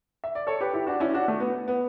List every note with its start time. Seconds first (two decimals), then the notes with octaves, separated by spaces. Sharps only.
0.24 E5
0.35 D5
0.47 A4 C#5
0.61 G4 B4
0.73 E4 G4
0.87 D4 F#4
1.00 C#4 E4
1.14 D4 F#4
1.28 A3
1.40 B3
1.68 B3